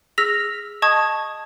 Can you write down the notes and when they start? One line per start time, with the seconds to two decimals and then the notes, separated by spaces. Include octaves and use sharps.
0.18 G#4 E6 F6 A#6 B6 F7
0.82 D#5 A5 C#6 D#6 G#6